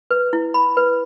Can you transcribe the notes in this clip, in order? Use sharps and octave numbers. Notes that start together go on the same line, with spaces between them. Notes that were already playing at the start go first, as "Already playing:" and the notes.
B4
E4
B5
B4